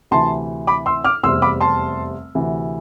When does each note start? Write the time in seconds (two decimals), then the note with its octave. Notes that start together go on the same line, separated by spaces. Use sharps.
0.11 D2 C3 E3 A5 C6
0.67 B5 D6
0.86 C6 E6
1.04 D6 F6
1.23 F1 E2 C3 G3 C4 C6 E6
1.42 B5 D6
1.61 A5 C6
2.35 D2 C3 E3